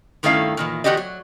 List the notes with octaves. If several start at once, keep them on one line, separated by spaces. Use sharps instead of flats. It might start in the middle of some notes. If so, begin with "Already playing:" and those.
G2 D#3 A3 C#4 E4 F5
A#2 D#3 E3
E2 E3 F#4 G4 D5 D#5
F#3